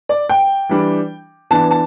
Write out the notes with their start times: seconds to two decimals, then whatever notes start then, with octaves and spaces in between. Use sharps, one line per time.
0.09 D5
0.29 G5
0.69 E3 G3 D4
1.51 E3 B3 D4 A5
1.71 A5